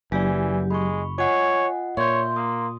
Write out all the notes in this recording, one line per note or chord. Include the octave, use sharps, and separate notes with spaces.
F#1 E3 F#3 G4 D5 G#5
G#3 B5 C#6
F4 C#5 D#5 F#5 G#5
A#2 C#5 E5 C6 G6
A#3 D#6